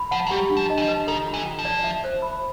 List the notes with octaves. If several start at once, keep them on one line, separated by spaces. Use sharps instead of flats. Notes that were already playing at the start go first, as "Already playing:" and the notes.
Already playing: B5
F3 F#5
F#3
G3 G4
D4
F3
D#5
E3
F3
B4
D#3 A4
F4
E3
G5
F3
D5
E5
C5
B5